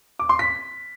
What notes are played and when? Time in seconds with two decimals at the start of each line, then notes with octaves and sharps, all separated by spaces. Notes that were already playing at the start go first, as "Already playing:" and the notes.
0.19 D6
0.29 C6
0.39 B6